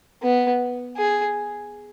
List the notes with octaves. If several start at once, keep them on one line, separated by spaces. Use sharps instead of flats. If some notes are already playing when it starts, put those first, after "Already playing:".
B3
G#4